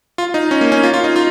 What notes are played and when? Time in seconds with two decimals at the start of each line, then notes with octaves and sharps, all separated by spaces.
0.18 F4
0.34 D#4
0.51 C#4
0.61 A#3
0.72 C#4
0.83 F4
0.94 F4
1.04 D#4
1.16 F4